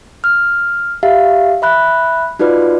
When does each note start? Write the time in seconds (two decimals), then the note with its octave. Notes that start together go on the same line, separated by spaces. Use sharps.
0.24 F6
1.03 G4 E5 F5
1.62 E5 B5 F#6
2.40 D#4 F4 F#4 B4 D5